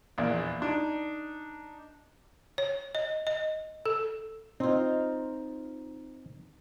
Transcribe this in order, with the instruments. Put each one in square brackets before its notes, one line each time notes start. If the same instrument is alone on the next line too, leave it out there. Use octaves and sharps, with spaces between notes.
[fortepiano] A#1 E2 D5
D4 D#4
[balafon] C#5
D#5
D#5
A4
[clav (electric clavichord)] C4 [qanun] D#4 F4